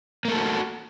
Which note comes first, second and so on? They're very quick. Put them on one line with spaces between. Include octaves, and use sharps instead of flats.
A#3 A3 A4 F#4